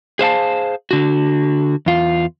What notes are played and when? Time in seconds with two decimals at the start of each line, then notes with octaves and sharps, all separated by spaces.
0.19 G#4 C5 F5 A5
0.91 D3 F#4
1.86 E2 F4